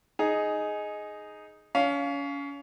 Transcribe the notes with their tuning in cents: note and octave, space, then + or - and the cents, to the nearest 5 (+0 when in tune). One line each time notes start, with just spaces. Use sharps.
D#4 +0 G#4 +10
C#4 +30 F5 +0